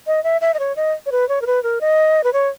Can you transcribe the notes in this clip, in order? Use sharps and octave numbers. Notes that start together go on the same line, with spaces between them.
D#5
E5
E5
D#5
C#5
D#5
C#5
B4
C#5
A#4
B4
A#4
D#5
B4
C#5